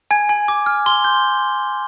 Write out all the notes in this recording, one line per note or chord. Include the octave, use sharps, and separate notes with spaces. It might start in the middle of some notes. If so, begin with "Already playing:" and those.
G#5 G#6
G#5
D6
F6
C6 G7
G6